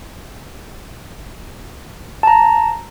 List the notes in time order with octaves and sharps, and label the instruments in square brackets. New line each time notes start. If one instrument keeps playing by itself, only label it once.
[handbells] A5 A#5